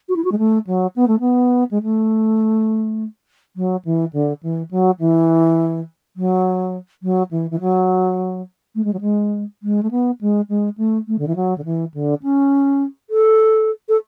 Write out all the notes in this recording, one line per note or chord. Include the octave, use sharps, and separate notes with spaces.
F#4
E4
F#4
G#3
A3
F#3
B3
A3
B3
G#3
A3
F#3
E3
D3
E3
F#3
E3
F#3
F#3
E3
E3
F#3
A3
G#3
F#3
G#3
G#3
A3
B3
G#3
G#3
A3
A3
D3
E3
F#3
D3
E3
D3
C#4
A4
A4